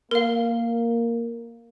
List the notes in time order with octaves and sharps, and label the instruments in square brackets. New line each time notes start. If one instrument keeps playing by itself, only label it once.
[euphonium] A#3 [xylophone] A#4 F5